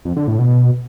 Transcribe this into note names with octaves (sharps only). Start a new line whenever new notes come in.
F2
D3
A2
B2